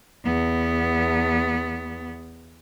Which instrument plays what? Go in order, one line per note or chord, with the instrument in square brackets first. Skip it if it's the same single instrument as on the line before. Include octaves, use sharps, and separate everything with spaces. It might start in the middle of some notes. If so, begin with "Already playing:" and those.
[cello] E2 B3